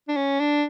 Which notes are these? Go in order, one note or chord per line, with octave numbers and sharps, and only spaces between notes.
D4
C#4
D4